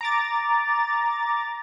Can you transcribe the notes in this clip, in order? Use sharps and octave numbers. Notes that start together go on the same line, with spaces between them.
A#5 D6 A6